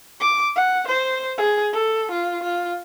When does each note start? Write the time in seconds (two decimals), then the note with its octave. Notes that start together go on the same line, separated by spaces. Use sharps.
0.20 D6
0.56 F#5
0.88 C5
1.38 G#4
1.73 A4
2.12 F4
2.43 F4